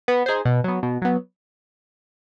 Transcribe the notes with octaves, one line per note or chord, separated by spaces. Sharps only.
B3
D#4 G#4 C5
B2
F#3 B3
B2
F#3 B3